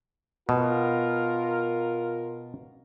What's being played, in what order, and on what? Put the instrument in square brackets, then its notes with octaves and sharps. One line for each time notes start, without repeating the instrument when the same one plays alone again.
[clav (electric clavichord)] B2 [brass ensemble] F4 A#4